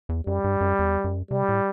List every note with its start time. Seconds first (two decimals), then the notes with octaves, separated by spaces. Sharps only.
0.09 E2
0.26 F#2 G3
0.44 G2
0.61 F#2
0.79 E2
1.04 F#2
1.31 C3 G3
1.49 A2